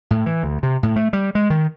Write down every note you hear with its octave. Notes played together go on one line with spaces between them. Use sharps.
A2
E3
D2
C3
A2
A3
G3
G#3
D#3